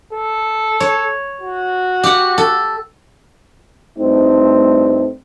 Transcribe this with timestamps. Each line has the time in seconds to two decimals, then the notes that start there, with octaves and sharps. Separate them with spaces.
0.13 A4
0.80 C#5
1.41 F#4
2.03 G4 F#5
2.38 A4
3.98 D2 G2 A3 C4 D4 D#4